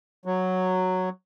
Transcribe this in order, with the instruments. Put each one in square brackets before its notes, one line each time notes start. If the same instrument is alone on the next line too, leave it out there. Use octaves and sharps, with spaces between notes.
[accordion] F#3